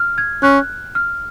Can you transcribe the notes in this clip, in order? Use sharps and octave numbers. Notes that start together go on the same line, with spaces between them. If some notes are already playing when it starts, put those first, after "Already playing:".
Already playing: F6
G#6
C#4 F#6
F6